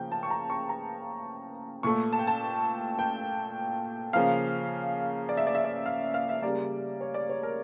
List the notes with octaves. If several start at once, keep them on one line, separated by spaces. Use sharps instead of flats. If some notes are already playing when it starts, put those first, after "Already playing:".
Already playing: C#3 F3 A#3 G5
A5
C#6
A#5
C#6
A#5
A#2 A3 C#6
A5
G5
A5
G5
C#3 F3 A#3 F5
D5
E5
D5
E5
D5
F5
F5
E5
C#3 G3 A#3 D5
C#5
D5
C#5
A#4